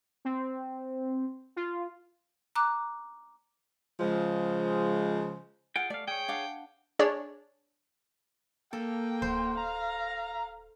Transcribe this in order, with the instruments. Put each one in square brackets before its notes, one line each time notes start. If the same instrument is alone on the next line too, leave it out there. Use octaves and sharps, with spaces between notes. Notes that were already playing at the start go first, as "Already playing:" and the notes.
[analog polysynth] C4
F4
[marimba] A#5 D6 F#6
[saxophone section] C#3 F3 G#3 C5
[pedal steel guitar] F4 G#4 G5 [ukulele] F#5
[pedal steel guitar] A3 F5 [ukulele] D5
[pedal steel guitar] G#4 C#5 [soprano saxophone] G5
[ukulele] D4 F5 F#5
[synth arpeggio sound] D4 G#4 C#5 D5
[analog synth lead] A#3 [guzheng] A4 [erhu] G5
[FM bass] D1 [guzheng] C5
[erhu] F5 [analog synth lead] A#5